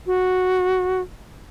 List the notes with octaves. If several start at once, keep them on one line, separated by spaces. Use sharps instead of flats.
F#4